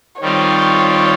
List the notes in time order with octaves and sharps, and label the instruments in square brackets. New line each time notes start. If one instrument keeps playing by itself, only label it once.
[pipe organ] D#3 G3 C4 F4 [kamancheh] C#5